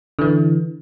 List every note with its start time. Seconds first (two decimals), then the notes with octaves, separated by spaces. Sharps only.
0.19 D3 E3